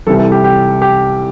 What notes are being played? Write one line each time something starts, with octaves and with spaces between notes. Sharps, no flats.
C2 C3 E3 G3 A4
A4
G4
G4
G4